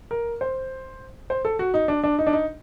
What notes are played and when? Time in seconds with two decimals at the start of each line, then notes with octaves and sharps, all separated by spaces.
0.11 A#4
0.41 C5
1.30 C5
1.45 A4
1.59 F#4
1.74 D#4
1.88 D4
2.04 D4
2.18 D#4
2.27 D4
2.33 D#4